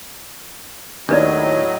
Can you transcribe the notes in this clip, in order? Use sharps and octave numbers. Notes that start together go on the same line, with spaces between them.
D#2 A2 F#3 D4 B4 D5 D#5